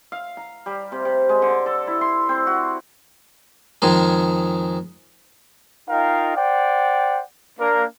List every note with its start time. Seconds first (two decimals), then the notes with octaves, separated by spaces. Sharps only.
0.12 F5
0.37 A#5
0.66 G3
0.92 C3
1.05 C3
1.29 G#3
1.42 D3
1.66 A4
1.87 E4
2.01 C6
2.29 C4
2.47 F#4
3.82 F2 D#3 G#3 G#4
5.89 D#4 F4 A#4 D#5 F5 G5
6.36 C5 D5 F#5 G5
7.59 A#3 D4 A#4